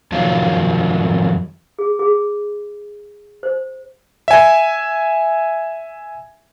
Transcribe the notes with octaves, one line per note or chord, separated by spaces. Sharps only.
F2 D#3 F#3 F4
G#4
G#4
C5
E5 G#5